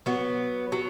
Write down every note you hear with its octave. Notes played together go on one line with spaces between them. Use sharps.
F#3 B3
F#3